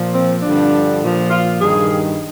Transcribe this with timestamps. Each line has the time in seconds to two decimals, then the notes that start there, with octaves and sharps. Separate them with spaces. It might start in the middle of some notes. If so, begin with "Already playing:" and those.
Already playing: A#2 F3
0.14 C4
0.43 G2 D3 F3 D4
1.02 A#2 F3
1.31 F4
1.61 G2 D#3 G#4